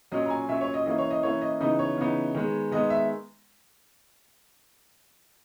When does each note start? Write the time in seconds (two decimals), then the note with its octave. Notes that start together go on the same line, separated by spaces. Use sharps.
0.12 A#2 F#3 C#4 D#5
0.26 A#5
0.30 G#5
0.49 A#2 F#3 C#4 E5
0.61 C#5
0.74 D#5
0.86 E3 A#3 C#4 E4 D#5
0.98 C#5
1.11 D#5
1.23 E3 A#3 C#4 E4 C#5
1.42 D#5
1.60 C#3 E3 B3 D#4 D#5
1.79 C#5
1.98 C#3 E3 B3 D#4
2.35 D#3 G#3 B3
2.72 D#3 G#3 B3 D#5
2.90 E5